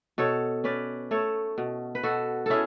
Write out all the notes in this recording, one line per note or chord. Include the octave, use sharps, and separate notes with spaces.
B2 A4 C#5
C#4 B4 D5
A3 A4 C#5
B2
B4
B2 F#4 A4
C#4 E4 G#4 A4